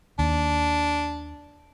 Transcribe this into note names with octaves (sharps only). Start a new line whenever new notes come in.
D#2 D4